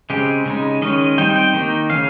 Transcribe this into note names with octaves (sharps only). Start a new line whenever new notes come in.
C#3 G#3 C4 G4
C#3 G#3 D#4
D#3 G#3 C#4 D#5
G3 C4 D#4 G5
G5
D#3 A#3 D#4
C#3 G3 C#4 F5